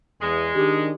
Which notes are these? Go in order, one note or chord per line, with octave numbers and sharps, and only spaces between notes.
E2 G#3
D#3 D4 G4 D6